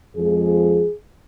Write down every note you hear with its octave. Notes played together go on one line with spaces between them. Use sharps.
F2 F3 G#3 G#4